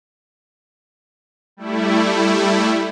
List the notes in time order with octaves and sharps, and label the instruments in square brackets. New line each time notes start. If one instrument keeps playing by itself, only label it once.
[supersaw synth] G3 A3 E4